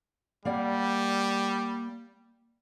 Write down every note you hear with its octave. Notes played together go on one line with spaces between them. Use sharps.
G3 A#3 D5 F#5